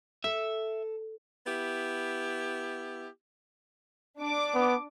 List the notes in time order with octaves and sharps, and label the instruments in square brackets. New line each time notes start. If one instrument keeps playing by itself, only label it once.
[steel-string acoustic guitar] A4 [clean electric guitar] E5
[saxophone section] B3 E4 G4
[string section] D4 D6
[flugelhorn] B3